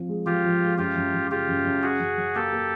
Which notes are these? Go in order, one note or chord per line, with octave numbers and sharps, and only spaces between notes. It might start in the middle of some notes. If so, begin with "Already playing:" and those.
Already playing: F3 C4
G#3
F3 F4 G4
F3
G#3
F#2 F4 G4
F#2
F#2
C#3 F4 G4
F#2
F#2
C#3 F#4 G#4
F#2
F#3
A#3 G4 A4
A#3